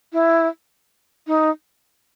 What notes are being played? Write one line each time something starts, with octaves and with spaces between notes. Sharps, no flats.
E4
D#4